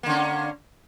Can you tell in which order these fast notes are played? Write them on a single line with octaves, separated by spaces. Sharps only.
A#3 D3 C#4